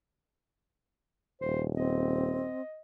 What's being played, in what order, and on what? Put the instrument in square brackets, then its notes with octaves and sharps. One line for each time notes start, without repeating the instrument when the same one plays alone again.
[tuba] D#1 [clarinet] C5
[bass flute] C4 [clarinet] D#5